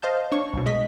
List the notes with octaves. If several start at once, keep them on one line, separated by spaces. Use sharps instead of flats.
C5 D#5 F5 A5 G6
D4 C#5 C#6
C2 B2
G#3 D#5 B6